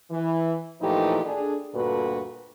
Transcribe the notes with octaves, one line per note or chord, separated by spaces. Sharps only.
E3
A#2 E3 F3 A3 D#4 G4
D4 G#4 A4
D2 G2 A#2 F#4 A4 B4